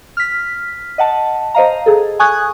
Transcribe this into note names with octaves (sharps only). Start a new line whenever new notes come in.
F6 B6
D#5 F#5 A5
C5 D#5 F5 A#5
G#4 A4
G#5 C#6 D#6 F#6 G#6